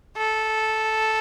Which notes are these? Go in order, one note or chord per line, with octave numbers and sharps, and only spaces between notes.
A4